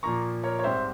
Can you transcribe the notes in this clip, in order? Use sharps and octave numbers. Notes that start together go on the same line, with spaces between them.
A#2 F3 A#3 A#5 C#6
A#4 C#5
C#5
G#2 G3 C4 C5 E5